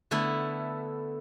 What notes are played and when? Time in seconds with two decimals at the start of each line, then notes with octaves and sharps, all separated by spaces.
0.11 D3 A3 B3 E4